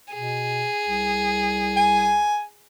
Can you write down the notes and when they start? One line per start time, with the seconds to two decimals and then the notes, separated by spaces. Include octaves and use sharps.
0.13 B2 G#4
0.81 C2
1.77 G#5